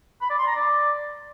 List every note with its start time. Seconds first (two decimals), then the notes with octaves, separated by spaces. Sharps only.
0.21 B5
0.30 D5
0.38 C6
0.47 A#5
0.56 D5